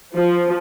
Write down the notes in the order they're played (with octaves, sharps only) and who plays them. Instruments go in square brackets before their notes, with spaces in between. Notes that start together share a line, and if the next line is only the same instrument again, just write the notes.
[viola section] F3